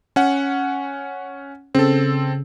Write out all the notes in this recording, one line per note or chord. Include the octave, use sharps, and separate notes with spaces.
C#4 F#5
C#3 C4 A4